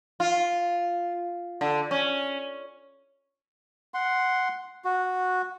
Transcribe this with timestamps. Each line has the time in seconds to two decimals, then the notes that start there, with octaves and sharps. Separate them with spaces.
0.20 F4
1.61 D3
1.91 C#4
3.94 F#5 C6
4.85 F#4